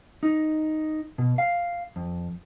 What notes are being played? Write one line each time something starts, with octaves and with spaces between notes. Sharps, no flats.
D#4
B2
F5
F2